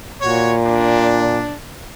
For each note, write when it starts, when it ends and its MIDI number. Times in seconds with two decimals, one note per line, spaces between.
0.19 1.47 46
0.19 0.52 66
0.19 0.52 73
0.66 1.53 62